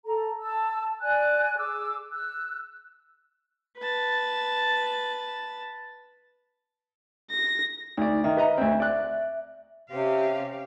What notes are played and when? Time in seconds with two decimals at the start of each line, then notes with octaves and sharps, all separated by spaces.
0.05 A4 A#5
0.41 A5 E6
1.01 D5 G#5 F#6
1.57 G#4 D6 E6
2.12 E6 F#6
3.78 B4 A5
7.31 A#6
7.97 D2 D#4 D5
8.24 D#3 E5
8.37 B4 D#5 A#5
8.58 D2 C4
8.80 D5 F#6
9.90 C3 C4 C#4 G4 F5